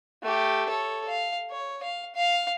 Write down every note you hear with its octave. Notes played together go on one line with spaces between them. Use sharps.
A3 G4
A4 C#5
F5
C#5
F5
F5